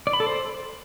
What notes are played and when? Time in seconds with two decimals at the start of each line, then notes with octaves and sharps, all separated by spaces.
0.07 D5
0.13 B5
0.20 A4
0.27 C5